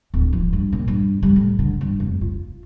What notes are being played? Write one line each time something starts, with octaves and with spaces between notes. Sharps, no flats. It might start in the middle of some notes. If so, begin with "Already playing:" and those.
D1
F3
G2
A#2
G2
G3
A2
D3
G2
F1
F4